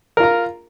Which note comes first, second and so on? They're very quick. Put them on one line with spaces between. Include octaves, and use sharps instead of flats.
A#4 F4 A#5